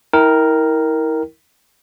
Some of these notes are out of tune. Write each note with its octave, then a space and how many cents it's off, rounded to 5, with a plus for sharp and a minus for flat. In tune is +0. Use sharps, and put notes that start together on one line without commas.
E4 -35 A#4 +0 G5 +0